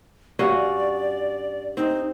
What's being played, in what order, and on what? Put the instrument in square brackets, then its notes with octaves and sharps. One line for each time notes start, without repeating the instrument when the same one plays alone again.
[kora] G2 C#4 F#4 [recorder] D5
[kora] C4 [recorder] D#4